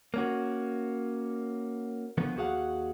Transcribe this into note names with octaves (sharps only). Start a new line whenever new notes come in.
A#3 C#4 F#4
D3 D#3 F3 B3
D#2 F#4 G#4 F5 F#5